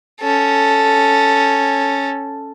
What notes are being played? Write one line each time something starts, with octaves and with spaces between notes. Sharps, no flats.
C#4 A4